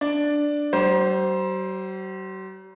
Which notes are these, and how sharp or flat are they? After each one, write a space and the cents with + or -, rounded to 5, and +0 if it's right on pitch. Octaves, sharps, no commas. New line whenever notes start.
D4 +0 D5 +0
F#3 +45 C5 +0